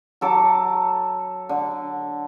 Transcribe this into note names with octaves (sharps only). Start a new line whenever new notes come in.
F#3 A4 D6
D3